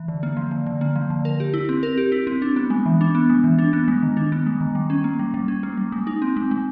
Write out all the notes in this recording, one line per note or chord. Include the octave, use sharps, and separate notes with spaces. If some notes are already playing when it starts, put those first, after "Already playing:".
Already playing: E3
D3
A#3
F3
D3
D3
A#3
F3
D3
A#4
G4
E4
C4
A#4
G4
E4
C4
D4
B3
G#3
E3
D4
B3
G#3
E3
D4
B3
G#3
D#3
D4
B3
G#3
D#3
G3
C#4
A#3
G3
G3
C#4
A#3
G3
G#3
D#4
C4
G#3
G#3